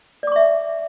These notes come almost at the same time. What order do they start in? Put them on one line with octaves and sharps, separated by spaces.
D5 D6 C#6 E5